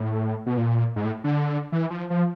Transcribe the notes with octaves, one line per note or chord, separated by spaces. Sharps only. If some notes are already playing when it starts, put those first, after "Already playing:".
Already playing: A2
B2
A#2
G#2
A2
D3
E3
F3
F3